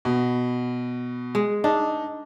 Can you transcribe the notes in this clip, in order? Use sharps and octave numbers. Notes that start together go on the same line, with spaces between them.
B2
G#3
D4 D#4